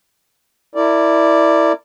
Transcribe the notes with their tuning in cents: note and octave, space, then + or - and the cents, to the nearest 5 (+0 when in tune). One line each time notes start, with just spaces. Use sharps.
E4 +0 A#4 -35 D5 +0